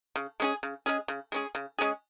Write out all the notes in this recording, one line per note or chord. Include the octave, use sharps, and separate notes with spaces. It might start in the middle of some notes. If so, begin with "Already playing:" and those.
C#3
G#3 C#4 G#4
C#3
G#3 C#4 G#4
C#3
G#3 C#4 G#4
C#3
G#3 C#4 G#4